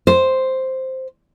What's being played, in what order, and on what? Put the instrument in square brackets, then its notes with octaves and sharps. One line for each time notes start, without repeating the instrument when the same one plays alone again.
[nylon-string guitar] C5